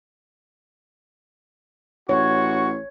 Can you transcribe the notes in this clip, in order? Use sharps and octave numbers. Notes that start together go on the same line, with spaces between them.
A1 F#4 C#5 C#6